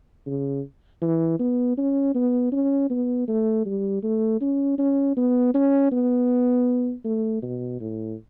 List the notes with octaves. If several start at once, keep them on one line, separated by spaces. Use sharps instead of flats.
C#3
E3
B3
C#4
B3
C#4
B3
A3
G3
A3
C#4
C#4
B3
C#4
B3
A3
B2
A2